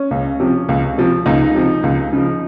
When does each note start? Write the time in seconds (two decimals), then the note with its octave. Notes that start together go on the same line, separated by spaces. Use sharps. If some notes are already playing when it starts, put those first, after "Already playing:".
Already playing: C#4
0.11 C#2
0.40 C3 F3
0.69 C#2
0.98 C3 F3
1.26 C#2 D#4
1.55 C3 F3
1.83 C#2
2.13 C#3 F3